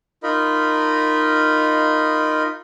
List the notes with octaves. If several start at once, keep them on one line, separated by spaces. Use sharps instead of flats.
D#4 F4 A#4 D#5 B5